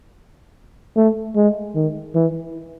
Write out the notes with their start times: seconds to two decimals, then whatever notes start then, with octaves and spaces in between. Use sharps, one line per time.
0.96 A3
1.36 G#3
1.75 D#3
2.15 E3